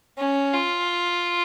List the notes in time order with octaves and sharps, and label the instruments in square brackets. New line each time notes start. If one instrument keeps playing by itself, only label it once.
[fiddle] C#4
F4